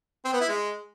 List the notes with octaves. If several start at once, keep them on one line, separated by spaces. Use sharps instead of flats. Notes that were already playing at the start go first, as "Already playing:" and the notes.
C4
B3
E4
G#3